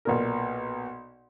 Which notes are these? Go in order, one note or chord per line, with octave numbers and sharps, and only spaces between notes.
B1 A#2 A#4